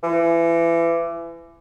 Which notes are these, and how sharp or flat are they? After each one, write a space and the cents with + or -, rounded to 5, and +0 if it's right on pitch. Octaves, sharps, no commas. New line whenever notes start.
E3 +30